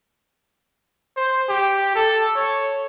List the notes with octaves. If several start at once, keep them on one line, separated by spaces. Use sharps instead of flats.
C5
G4
A4
C#5